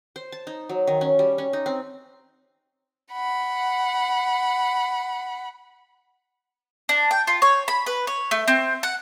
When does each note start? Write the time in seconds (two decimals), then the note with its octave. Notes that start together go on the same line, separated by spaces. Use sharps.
0.16 C5
0.32 A5
0.47 D#4
0.69 F#3
0.87 D#3
1.01 C#4
1.19 G3
1.38 C#4
1.53 D#4
1.66 C4
3.12 F#5 B5
6.89 D4
7.11 G5
7.27 F4
7.42 C#5
7.68 B5
7.86 B4
8.07 C#5
8.31 A3
8.48 C4
8.83 F#5